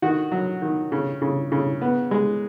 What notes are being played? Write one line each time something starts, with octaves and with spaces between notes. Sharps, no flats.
D#3 F#4 F#5
F#3
D#3
C#3
C#3
C#3
B3
G#3